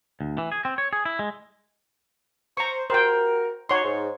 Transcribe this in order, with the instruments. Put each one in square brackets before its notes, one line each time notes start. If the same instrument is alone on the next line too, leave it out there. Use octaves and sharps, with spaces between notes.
[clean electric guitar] D2
E3
G#4
C4
C#5
G#4
E4
G#3
[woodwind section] C5 [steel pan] A#5 C#6
[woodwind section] F#4 G4 A#4 [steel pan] C5 G5
[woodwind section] D#4 F#4 [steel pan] C#5 C6
[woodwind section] G#2